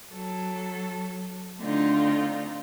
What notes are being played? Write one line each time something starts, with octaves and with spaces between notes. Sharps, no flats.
F#3 A4
D3 A3 C4 D#4 F4